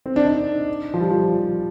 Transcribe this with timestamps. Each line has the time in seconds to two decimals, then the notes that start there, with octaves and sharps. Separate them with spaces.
0.06 C4
0.16 D4
0.25 D#4
0.94 F3
1.00 G3
1.10 F3